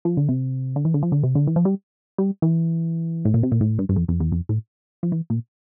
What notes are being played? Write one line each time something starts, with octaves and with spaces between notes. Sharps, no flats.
F3
D3
C3
D3
E3
D3
F3
D3
C3
D3
E3
F3
G3
G3
E3
A2
A#2
C3
A#2
A2
G2
G2
F2
F2
E2
F2
A2
F3
E3
A#2